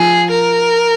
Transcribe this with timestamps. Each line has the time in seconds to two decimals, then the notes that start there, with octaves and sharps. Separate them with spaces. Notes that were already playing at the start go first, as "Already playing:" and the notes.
Already playing: F3 G#4
0.30 A#4